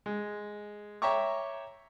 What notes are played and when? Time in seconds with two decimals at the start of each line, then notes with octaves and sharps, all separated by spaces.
0.06 G#3
1.02 C#5 E5 G5 A#5 C#6 D6